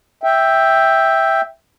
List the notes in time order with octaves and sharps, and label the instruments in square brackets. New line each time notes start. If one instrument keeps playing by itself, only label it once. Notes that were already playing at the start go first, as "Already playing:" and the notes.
[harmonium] E5 G5